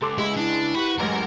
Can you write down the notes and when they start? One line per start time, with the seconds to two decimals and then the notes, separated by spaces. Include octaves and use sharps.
0.02 C#2 A4 C6 D6
0.18 G#3 E4
0.37 D4 E4
0.75 F#4 G4 B4 B5
1.00 A1 F#2 G#3 A#4 A#5